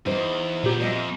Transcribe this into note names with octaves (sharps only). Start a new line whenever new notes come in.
E2 D#4 C5
A#2 F#3 B3 G4
F2 C5 D#5 E5